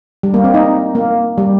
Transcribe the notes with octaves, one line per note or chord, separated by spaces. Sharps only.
G3
A#3
C4
D#4
A#3
G3